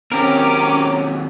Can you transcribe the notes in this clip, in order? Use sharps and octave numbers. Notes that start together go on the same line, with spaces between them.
D#2 C4 C#4 G4 A#4 A#5 D6